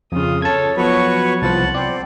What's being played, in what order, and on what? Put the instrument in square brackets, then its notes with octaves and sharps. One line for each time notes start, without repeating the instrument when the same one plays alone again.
[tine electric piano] F2 C#3 [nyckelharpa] F4 D#6
[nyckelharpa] A4 C#5 [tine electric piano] A5 G#6
[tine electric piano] F3 F#3 [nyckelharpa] B3 C#6 [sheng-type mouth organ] F#4 B4 C#5
[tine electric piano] C2 F3 C5 [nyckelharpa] F#5 [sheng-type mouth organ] A5
[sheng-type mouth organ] C4 [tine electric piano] D5